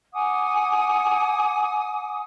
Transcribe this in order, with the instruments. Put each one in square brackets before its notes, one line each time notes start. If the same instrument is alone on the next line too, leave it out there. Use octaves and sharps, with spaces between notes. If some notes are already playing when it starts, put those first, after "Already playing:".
[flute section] F#5 G#5 D6 D#6